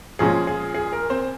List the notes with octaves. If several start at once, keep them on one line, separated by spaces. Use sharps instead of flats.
A#2 F3 G#3 C#4 G#4
G#4
G#4
A#4
C4 C5